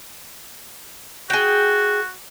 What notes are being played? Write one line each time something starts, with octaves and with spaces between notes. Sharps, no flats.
F#4 G#4 G5